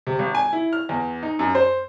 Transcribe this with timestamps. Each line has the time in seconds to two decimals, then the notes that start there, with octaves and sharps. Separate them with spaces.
0.07 C3
0.19 G#1
0.35 G#5
0.53 E4
0.73 F6
0.89 E2
1.23 D#4
1.39 F#2
1.55 C5